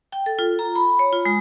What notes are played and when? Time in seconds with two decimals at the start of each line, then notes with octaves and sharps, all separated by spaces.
0.12 G5
0.26 A4
0.39 F4
0.59 A#5
0.75 B5
0.99 C#5
1.13 F4
1.25 G#3